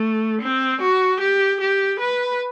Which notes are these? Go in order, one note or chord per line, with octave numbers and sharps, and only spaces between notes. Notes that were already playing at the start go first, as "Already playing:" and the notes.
Already playing: A3
C4
F#4
G4
G4
B4